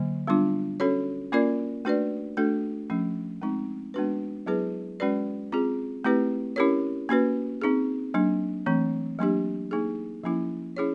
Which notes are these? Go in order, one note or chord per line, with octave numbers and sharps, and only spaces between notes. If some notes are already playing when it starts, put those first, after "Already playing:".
Already playing: D3 F#3 A#3
G3 B3 D4 F4
C#4 F#4 A4 C#5
A#3 C#4 F4 A#4 D5
A3 D4 F#4 B4 D5
A3 D4 F#4 A4
F3 A3 C#4
G#3 C4 D#4
G#3 B3 D4 F#4 B4
F#3 B3 E4 G#4 B4
G#3 C#4 F#4 B4 D5
C4 F4 G#4
A3 C4 E4 G4 B4
C#4 E4 G4 A#4 C#5
A#3 C#4 F#4 B4
C4 D#4 G#4
F#3 A#3 D4
E3 A3 C4
F#3 A#3 D4 G4
A#3 D#4 G#4
F3 A#3 C#4 E4
C#4 E4 G#4 C#5